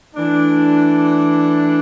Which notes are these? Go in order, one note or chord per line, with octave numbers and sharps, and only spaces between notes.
E3 A3 D4